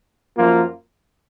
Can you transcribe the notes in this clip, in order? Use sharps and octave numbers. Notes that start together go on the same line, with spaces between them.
F#2 F3 A#3 F4